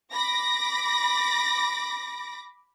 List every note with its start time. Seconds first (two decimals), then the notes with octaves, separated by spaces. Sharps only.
0.13 B5 D6 A#6